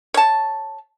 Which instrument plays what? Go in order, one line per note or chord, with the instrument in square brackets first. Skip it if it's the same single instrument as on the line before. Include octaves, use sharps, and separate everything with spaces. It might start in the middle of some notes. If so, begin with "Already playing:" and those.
[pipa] C#5 A5